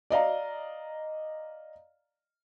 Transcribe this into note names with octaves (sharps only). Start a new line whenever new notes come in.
D5 D#5 F5 A#5